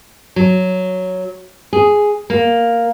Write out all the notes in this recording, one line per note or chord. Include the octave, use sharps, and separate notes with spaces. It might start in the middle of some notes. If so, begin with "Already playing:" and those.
F#3
G#4
A#3